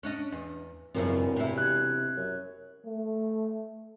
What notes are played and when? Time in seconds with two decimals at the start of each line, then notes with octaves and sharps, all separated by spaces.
0.03 C#4 D4 D#5
0.32 E2
0.95 E1 F#2 C#3 F3 C4 A#4
1.36 C3 E4
1.58 F#6 G#6
2.17 F#2
2.86 A3